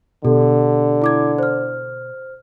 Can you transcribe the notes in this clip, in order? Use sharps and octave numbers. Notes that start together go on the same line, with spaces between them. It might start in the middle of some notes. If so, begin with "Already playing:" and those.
B2 D3 G4 A4
E4 D6 G#6
C5 F6